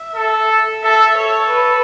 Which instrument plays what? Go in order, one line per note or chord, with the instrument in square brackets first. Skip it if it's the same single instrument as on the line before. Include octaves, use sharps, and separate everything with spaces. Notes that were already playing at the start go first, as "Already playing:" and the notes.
Already playing: [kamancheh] E5
[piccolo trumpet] A4
[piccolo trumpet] A4 [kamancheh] E5
[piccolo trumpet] A4 [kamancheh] C#5
[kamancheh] B4